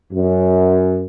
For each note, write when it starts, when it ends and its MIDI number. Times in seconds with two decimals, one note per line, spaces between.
0.13 1.06 42